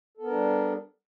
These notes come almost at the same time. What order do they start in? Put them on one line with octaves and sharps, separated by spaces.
A4 B3 A#4 D4 G3